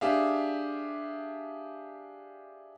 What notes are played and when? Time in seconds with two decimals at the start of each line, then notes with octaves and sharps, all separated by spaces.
0.01 D4 G4 G#4 E5 F5